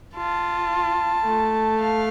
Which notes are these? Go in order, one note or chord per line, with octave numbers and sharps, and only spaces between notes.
F4 A5
A3
F5